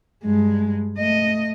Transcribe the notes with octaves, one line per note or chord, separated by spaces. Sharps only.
G2 G#3
A3 D#5